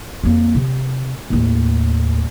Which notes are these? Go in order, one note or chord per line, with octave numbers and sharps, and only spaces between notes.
F2 A#3
C3
D#2 A2